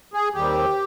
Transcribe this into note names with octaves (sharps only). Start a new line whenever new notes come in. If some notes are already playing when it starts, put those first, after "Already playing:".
G#4
D#2 D#3 G3 C4 G4